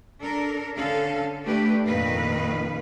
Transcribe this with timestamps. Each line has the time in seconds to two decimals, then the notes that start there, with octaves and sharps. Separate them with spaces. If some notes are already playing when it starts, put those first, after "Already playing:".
0.22 D4 A4 A#4
0.77 D3 C#4 A4 F5
1.44 A3 D4 G4 B4
1.86 F2 A#2 D#3 A#3 B4 F5